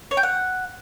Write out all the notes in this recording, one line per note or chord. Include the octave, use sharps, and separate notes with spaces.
C#5
G5
F#5